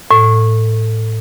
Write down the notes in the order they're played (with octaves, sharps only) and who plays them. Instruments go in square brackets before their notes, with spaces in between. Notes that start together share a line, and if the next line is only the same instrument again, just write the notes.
[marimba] A2